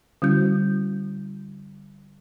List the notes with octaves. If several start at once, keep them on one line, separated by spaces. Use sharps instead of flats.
D3 G3 C#4 E4 F#4 G6